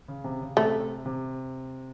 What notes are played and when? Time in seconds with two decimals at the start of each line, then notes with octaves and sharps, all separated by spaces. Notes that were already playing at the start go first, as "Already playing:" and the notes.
0.08 C#3
0.24 C3
0.41 C#3
0.57 C3 A3
1.06 C3